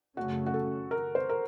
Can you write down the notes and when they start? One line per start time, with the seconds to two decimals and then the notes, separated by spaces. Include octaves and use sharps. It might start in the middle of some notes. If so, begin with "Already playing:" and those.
0.17 F#2 C#3 A3 C#4 F#4
0.46 F#4
0.54 A4
0.91 A#4
1.15 C5
1.29 A#4